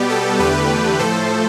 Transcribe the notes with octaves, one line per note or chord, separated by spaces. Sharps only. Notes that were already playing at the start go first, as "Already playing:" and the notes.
Already playing: B2 G3 B3 G4
A4
E2 D3 A3 G4 B4
A2 F3 A3 A4 C5